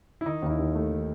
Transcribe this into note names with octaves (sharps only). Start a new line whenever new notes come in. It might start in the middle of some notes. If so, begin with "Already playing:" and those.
E4
D#3 D#4
D#2 D#4
E4
D#2
A3
D#3